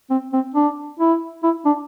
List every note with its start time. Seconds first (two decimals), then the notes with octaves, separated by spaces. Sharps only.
0.10 C4
0.33 C4
0.54 D4
0.99 E4
1.43 E4
1.65 D4